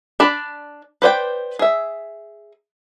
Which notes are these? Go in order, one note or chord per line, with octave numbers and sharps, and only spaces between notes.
D4 D5 A5 B5
B4 C5 D5 G5
G#4 E5